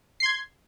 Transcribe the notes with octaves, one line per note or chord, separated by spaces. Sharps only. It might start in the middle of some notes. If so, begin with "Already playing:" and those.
C6 G#6 C7